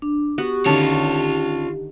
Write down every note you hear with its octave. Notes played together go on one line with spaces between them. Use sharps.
D4
B3 F#4 G4
D3 D#3 C#4 F4 C#5 D5 A5